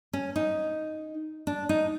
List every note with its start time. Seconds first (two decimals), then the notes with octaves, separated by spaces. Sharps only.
0.13 C#4
0.36 D#4
1.47 D4
1.69 D#4